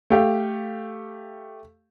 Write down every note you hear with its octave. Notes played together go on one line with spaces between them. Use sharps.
A3 G4 F5